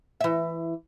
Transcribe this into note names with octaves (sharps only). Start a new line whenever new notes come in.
E3 E5